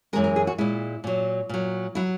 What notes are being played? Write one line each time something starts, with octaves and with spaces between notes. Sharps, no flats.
F#2 E3 G#3 A#4
A#4
G#4
F#4
A#2 G#3 E4
A#2 F#3
A#2 F#3
F#3 E4